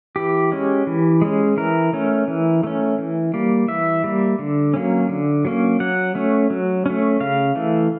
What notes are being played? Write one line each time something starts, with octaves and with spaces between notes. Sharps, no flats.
E3 G4
G#3 C#4
E3
G#3 C#4
E3 A#4
A3 C#4
E3
A3 C#4
E3
G3 A#3
E3 E5
G3 A#3
D3
F#3 A#3 C#4
D3
F#3 A#3 C#4
F#3 F#5
A3 C#4
F#3
A3 C#4
C#3 F5
E3 A3